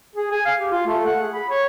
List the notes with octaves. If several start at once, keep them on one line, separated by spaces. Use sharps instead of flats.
G#4
G#5
F5
G4
F4
A3
F#5
G#4
B5
C#5